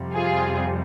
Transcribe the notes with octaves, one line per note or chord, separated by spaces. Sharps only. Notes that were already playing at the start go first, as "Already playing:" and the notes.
Already playing: F2 C3 G3
F4 G#4